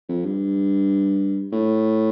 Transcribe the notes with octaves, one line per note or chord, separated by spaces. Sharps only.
F2
G2
A2